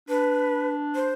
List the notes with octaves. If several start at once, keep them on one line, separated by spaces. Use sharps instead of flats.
D4 B4
C5